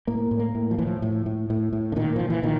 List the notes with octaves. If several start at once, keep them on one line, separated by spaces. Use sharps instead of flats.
A2 A#3
A2
A#3
A2
F3
A2 E3
F3
A2
A2
A2
A2
D3
A#2 D#3
A#2 F3
E3
A#2 D#3